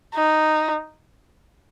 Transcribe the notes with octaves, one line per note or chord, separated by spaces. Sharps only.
D#4